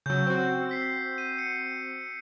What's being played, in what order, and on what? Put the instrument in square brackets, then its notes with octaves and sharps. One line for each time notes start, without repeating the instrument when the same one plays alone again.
[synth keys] C#3 F#3 [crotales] E6 G6
[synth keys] C4 F#4
[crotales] E6 B6 C7
D#7
C#7